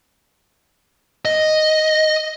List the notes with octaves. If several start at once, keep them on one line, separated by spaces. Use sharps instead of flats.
D#5